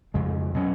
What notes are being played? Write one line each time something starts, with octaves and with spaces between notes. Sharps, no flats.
F2 C#3 G#3
B2 F#3 C#4